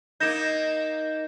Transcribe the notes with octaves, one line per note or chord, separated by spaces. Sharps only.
A#3 D#4 G6 A#6 E7